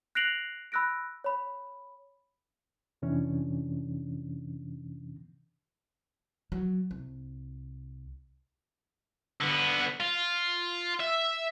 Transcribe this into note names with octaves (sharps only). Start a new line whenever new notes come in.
F#6 A#6 C7 D7 F7 F#7
B5 E6 F#6 A#6 D7
C#5 B5
F2 C3 E3 C#4 D4
F#3
C2
D3 B3
F4
E5